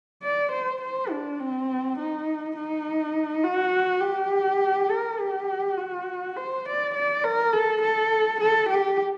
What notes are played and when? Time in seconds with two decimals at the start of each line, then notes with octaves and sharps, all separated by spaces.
0.23 D5
0.52 C5
0.82 C5
1.11 D4
1.40 C4
1.99 D#4
2.56 D#4
3.44 F#4
4.02 G4
4.90 A#4
5.20 G4
5.78 F#4
6.36 C5
6.65 D5
6.95 D5
7.24 A#4
7.53 A4
7.81 A4
8.41 A4
8.70 G4